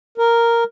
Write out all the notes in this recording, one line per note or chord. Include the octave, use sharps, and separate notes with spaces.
A#4